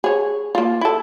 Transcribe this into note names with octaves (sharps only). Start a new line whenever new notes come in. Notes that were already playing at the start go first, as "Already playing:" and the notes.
G#4 C#5
A#3 F4
E4 A4